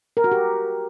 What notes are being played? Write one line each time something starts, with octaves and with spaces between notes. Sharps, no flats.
A#4
F#4
G4